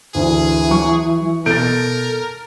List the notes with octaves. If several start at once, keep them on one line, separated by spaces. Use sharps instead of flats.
D2 E3 G#4
F#3 C#6
B2 A4 A#4 G6 A6 D7